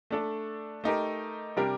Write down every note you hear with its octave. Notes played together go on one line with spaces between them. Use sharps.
A3 D4 A4
A3 D#4 G4 A#4
C3 G3 D4 G4 A#4